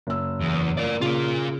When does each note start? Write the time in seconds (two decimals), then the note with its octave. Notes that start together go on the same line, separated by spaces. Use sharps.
0.07 F#1 E6
0.41 E2
0.78 A#4 D5
1.02 C#3 F4 A#4